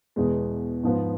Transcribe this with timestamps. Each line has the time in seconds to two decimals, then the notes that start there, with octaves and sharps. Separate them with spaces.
0.16 E2 B2 G#3
0.83 G#2 F3 B3